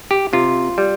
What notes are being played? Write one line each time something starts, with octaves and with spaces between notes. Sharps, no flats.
G4
C3 F4
G3